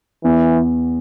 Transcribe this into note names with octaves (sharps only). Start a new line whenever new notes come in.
E2 E3